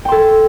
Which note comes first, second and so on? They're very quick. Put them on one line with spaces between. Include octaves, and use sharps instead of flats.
G5 C6 A4